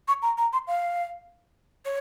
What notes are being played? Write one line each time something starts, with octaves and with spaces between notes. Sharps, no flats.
C#6
A#5
A#5
C6
F5
C#5